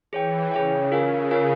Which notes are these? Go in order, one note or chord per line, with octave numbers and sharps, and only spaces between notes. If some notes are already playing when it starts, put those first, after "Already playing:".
E3 G#4 C#5 G5
C#3 G#4 C#5 G5
C#3 F4 A#4 F5 G#5
F4 A#4 F5 G#5